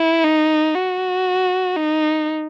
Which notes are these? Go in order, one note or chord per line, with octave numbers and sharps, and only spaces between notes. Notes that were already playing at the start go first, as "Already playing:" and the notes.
Already playing: E4
D#4
F#4
D#4